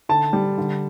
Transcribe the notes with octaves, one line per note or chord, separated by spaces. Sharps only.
D3 A5
G3
D3